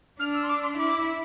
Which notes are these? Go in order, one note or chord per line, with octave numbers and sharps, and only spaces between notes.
D4 F6
E6
C6
D6
C6
E4 D6